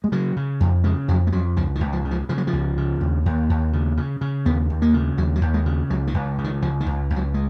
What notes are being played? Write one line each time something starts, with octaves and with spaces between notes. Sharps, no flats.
G#3
C#3 F#3
C#3
F2
C#3 G#3
F2 F#3
G#3
F2 F#3
C#2 F3
D#3
C#2
F3
C#3
F3
C#3 F3
F#3
F3
C#2
C#3
D#2
D#2
D#2
C#3
C#3
C#3
D#2 B3
D#2
A#3
C#3
D#2 F#3
F#3
D#2
G#3
C#3
C#2 F#3
D#3
C#2
C#3
D#3
C#2 F3
D#3
C#2
C#2
F#3
G#3